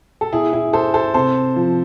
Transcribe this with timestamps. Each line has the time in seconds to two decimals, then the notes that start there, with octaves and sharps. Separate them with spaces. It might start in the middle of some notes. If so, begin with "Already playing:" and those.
0.21 A4
0.32 B2 E4 G#4
0.53 E4 G#4
0.73 A4 C5
0.94 A4 C5
1.14 C3 A4 C5
1.56 F3